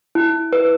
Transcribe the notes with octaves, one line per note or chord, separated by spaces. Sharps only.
E4
B4